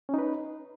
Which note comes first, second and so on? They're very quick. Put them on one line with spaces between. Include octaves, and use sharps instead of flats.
C#4 D#4 B4